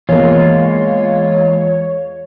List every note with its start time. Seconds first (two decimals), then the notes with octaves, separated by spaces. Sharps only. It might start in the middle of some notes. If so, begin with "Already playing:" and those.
0.09 E2 G#3 A#3 F4 C#5